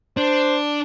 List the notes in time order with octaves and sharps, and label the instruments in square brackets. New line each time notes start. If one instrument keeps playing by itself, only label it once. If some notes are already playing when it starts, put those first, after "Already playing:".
[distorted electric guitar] D4 [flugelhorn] C5